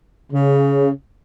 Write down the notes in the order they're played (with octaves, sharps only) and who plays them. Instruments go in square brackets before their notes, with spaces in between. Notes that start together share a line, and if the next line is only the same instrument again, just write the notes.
[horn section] C#3